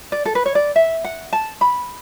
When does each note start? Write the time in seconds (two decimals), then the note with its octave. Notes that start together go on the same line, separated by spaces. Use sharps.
0.12 D5
0.25 A4
0.35 B4
0.46 C#5
0.55 D5
0.76 E5
1.04 F#5
1.33 A5
1.61 B5